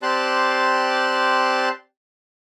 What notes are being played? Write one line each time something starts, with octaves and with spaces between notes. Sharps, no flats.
C4 G4 D5 A5 C6 F#6